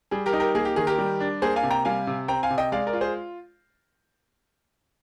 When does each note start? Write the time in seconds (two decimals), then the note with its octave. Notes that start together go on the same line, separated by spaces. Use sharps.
0.11 G3 G#4
0.26 G4 A#4
0.33 D#4
0.40 G4 A#4
0.55 A#3 G#4
0.65 G4
0.76 D#3 G#4
0.87 G4 A#4
0.98 G3
1.20 D4
1.42 A#3 G#4 C5
1.56 F5 G#5
1.63 C3
1.71 G5 A#5
1.85 G3 F5 G#5
2.07 C3
2.28 C4 G5 A#5
2.43 F5 G#5
2.50 C3
2.58 D#5 G5
2.72 G#3 D5 F5
2.87 A#4 D5
2.93 F4
3.01 G#4 C5